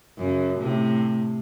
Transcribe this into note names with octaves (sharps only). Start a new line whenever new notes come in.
F#2 C#3
A2 C3